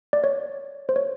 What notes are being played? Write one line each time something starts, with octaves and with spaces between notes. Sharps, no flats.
D5
C#5
C5
C#5